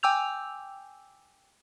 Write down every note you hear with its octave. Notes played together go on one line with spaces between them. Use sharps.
G5 G#5 D6 E6 G6 F7